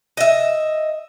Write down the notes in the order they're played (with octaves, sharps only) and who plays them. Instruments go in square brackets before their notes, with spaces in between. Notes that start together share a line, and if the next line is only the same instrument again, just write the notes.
[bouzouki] D#5 E5